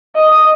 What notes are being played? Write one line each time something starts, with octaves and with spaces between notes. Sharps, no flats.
D#5